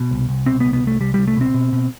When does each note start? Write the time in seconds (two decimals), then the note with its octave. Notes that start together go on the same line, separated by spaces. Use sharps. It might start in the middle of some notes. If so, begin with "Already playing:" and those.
Already playing: B2
0.11 C2
0.29 C2
0.46 B2 C4
0.60 B3
0.65 C2
0.73 B3
0.83 C2 A3
1.00 C2 G3
1.14 C2 G3
1.27 A3
1.36 B2 C4
1.54 B2
1.72 B2